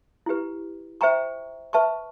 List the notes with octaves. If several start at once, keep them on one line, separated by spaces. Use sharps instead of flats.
E4 G4 B4
C5 E5 G5 A#5 C#6
B4 E5 A5 C#6